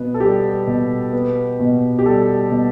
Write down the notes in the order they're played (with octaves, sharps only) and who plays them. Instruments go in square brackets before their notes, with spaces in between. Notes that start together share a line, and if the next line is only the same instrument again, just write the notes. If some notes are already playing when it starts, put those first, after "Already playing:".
Already playing: [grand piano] B2 B3
A4
G3 G4
B2
B3
B2
G4
G3 A4
B2